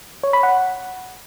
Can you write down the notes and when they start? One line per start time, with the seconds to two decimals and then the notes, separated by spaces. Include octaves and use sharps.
0.23 C#5
0.33 B5
0.43 F#5